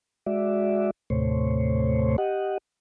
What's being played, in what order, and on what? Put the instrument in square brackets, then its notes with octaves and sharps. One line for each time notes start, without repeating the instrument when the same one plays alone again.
[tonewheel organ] G#3 F#4 D5 E5
D#2 A2 C3 A3 C5 C#5
G4 D#5 F#5